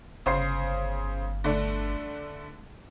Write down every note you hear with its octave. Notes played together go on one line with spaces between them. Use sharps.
G1 C#3 C5 C7
D3 A3 D4